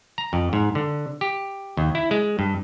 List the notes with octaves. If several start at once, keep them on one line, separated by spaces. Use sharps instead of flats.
A#5
F2
G#2
D3
G4
D#2
E4
G#3
G2